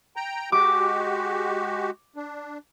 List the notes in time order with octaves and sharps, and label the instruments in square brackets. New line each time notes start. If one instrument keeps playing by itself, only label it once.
[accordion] G5 A#5
[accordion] G#3 F#4 G4 [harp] D6
[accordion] D4